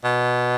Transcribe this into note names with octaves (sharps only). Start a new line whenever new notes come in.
B2